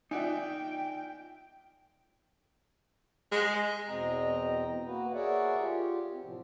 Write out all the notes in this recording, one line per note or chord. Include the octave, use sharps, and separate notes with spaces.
D#4 F4 D5 E5 G5 G#5
G#3
E2 B2 C4 D#5 G5 A#5
A#3 F#4 B4
G#4 A#4 C#5 D5 E5 F#5
F4 G4
C4
A2 C3 F3